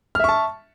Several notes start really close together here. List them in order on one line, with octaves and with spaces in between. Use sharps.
F6 E5 C#6 A5